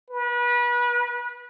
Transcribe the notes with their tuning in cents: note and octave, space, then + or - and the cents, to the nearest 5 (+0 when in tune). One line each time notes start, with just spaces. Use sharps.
B4 -30